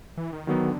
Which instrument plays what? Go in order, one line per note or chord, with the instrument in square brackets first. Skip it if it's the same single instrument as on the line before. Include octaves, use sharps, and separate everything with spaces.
[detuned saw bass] E3
D#3
[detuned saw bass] D3 [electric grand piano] D#3 F#3 B3